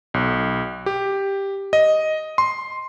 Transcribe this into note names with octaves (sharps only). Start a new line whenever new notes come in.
B1
G4
D#5
C6